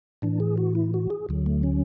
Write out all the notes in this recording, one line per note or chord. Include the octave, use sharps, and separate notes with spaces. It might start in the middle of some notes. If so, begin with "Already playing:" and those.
A2 E3 D4
G#4
F#4
E4
F#4
G#4
D2 D3 F#3
A3
C#4